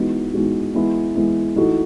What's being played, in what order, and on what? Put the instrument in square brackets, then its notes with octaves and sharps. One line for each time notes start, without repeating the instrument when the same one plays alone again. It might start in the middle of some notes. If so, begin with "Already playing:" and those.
Already playing: [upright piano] E3 G#3 B3 D#4 F#4
E3 G#3 B3 D#4 F#4
E3 G#3 B3 E4
E3 G#3 B3 E4
E3 A3 D#4 F#4